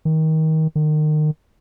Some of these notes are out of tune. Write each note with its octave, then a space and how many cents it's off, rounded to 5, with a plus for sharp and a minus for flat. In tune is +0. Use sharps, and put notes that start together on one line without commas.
D#3 +25
D#3 -30